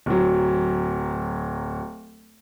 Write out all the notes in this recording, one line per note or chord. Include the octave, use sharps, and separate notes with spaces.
D1 F#3